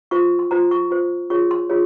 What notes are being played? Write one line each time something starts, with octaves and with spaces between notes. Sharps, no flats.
F4 C5 C#6
C6
F4 C5 A#5
C#6
F4 C5
F4 G#4 C#5 C#6
C6
F4 G#4 C#5